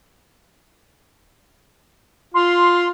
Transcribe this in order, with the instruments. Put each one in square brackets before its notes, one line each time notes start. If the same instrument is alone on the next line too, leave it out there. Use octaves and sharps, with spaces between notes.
[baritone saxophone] F4 [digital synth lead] C6